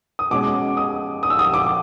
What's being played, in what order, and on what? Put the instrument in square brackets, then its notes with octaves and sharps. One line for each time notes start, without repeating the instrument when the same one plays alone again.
[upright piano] D#6
B2 G#3 C#4 D6
D#6
D#6
E6
D#6
D6